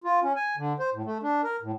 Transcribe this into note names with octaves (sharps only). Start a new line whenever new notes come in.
F4
C#4
G#5
D3
C5
A2
A3
D4
A#4
A2